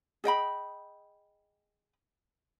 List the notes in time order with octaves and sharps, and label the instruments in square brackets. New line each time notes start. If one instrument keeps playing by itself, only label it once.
[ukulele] G#4 D#5 G5 B5